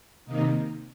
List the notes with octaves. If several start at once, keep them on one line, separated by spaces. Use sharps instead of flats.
C3 D#3 A#3 D#4